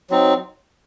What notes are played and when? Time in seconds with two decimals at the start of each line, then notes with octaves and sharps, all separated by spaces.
0.10 F#3 C4 D#4